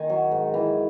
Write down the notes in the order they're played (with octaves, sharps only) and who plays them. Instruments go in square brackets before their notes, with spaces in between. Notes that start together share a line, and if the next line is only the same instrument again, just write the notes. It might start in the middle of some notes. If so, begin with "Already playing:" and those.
Already playing: [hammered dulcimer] D#3 G#5
F#3
G#2
E3